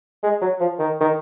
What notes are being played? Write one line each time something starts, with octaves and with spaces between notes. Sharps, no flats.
G#3
F#3
F3
D#3
D#3